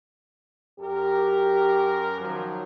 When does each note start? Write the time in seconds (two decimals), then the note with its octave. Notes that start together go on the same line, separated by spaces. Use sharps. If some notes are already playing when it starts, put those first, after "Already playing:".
0.79 F#2 G4 A#4
2.20 D#3 F3 F#3